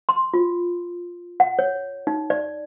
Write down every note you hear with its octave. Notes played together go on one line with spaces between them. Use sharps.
C6
F4
F#5
C#5
D#4
D5